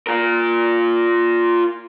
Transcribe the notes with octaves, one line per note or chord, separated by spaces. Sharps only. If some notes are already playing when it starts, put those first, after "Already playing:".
F4 A#4